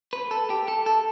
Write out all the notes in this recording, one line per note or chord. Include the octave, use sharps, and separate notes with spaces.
B4
A4
G4
A4
A4